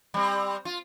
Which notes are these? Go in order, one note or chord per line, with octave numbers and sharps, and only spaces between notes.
G3 C4
F4